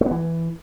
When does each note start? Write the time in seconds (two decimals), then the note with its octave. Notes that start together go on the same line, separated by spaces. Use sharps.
0.01 A3
0.06 B3
0.11 E3